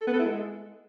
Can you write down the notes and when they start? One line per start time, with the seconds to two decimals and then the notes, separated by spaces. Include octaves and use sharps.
0.01 A4
0.07 B3
0.13 A4
0.19 E4
0.25 G#3